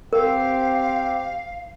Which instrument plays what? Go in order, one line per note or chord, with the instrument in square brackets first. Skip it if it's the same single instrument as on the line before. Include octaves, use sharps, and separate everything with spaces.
[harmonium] C4 G4 [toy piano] A#4 [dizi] F5